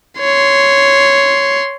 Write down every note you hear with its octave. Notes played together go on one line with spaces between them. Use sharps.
C#5 C6